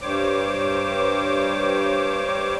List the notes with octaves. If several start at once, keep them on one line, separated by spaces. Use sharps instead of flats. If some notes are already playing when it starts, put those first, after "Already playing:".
G2 G3 C5 C#5 D6